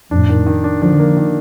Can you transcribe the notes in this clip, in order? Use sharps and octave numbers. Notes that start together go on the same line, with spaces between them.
F2 A2 D4
D#3
D#3
D4
D3 F3 D4
A#3
D#3